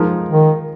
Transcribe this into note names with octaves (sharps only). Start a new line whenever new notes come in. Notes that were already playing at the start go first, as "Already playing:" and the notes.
Already playing: F3 G#3 D#4 A#4
D#3